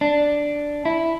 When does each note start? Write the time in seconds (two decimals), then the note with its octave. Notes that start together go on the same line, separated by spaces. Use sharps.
0.01 D4
0.85 E4